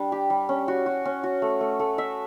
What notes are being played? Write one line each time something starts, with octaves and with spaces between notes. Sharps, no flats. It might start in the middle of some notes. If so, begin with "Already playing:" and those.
Already playing: G3 D4
G4
G3
C#4
F#4
F#4
C#4
F#4
A3
A3
A3
E5